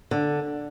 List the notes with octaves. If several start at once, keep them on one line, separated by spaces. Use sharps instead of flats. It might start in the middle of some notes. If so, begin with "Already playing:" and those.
D3